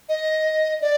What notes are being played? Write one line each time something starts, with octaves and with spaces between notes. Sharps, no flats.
D#5
D5